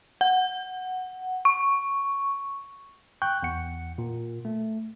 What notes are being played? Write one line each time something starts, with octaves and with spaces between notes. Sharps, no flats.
F#5
C#6
G5 C#6 F#6 G6
E2 F#5 C#7
A#2
A3